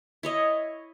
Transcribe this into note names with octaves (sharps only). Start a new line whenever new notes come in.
E4 C#5 D#5